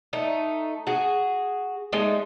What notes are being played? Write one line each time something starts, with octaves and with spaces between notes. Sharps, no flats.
A3 D#4
F#4 G#4
G#3 A3 D#4